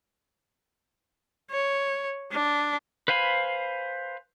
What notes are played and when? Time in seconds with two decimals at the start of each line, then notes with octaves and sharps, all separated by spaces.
1.51 C#5
2.32 D4
3.08 B4 C5 F5 G#5 B5